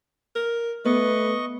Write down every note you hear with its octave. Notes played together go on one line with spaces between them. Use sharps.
A#4
A3 B3 B4 D#5 C#6